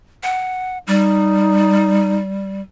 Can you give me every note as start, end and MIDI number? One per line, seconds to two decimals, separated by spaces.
0.23 0.78 78
0.87 2.61 55
0.87 2.17 63